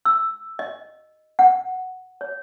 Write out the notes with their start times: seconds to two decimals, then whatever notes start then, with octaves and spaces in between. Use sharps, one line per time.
0.05 E6
0.59 D#5
1.39 F#5
2.21 C#5